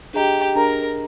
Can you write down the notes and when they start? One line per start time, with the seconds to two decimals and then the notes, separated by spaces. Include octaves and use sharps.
0.14 D4 G4 G#4 D#5 A#5
0.55 D4 G#4 A#4 D#5 A#5